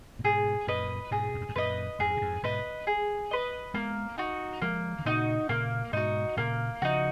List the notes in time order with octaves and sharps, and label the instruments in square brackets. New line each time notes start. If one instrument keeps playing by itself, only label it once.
[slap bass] A#2
[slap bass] G#2 B2 [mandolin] G#4
[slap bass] F#2 A#2 [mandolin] B4 D#5
[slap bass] G#2 B2 [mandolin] G#4
[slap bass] F2
F#2
G#2
[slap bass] F#2 A#2 [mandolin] B4 D#5
[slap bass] F2 G#2 [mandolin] G#4
[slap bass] A#2
F2 G#2
[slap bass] G#2 B2 [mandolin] B4 D#5
[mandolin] G#4
B4 D#5
[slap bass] G#3 B3 [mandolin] A#3
[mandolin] D#4 F#4
[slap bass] F3 G#3 [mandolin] A#3
[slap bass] D#3
[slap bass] A#2 C#3 [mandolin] D#4 F#4
[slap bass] A#2 C#3 [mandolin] A#3
[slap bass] G#2 B2 [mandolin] D#4 F#4
[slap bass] A#2 C#3 [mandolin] A#3
[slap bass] C#3 F3 [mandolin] D#4 F#4